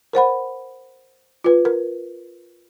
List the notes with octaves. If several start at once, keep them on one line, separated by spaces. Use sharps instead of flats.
A#4 C5 F#5 B5
F4 B4
A#4